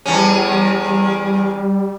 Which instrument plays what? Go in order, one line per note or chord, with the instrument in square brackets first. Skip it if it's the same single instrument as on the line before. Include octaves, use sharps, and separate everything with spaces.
[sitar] E2 C#4 [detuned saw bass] G3